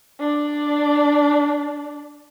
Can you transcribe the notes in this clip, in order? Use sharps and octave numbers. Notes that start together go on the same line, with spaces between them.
D4 D5